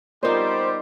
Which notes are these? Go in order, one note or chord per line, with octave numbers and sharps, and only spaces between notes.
G3 B3 D#4 F4 A#4 C5 D5 D6